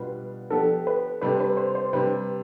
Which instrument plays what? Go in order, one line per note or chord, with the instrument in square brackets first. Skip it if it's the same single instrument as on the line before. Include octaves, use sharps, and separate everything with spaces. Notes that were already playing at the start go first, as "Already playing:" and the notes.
Already playing: [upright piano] B2 G3 B3 D4 F4 [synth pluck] B4
[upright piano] F3 B3 D4 G4 [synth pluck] A4
[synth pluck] B4
[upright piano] C3 G3 D4 A4 D5 [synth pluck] B4
[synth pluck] B4
C5
C5
[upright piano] C3 G3 D4 [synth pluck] B4